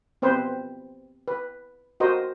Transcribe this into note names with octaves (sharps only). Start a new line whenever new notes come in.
B3 C4 B4 C5
B4
F#4 A#4 C5 D#5